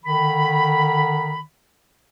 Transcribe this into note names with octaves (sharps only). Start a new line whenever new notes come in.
D3 D#3 B5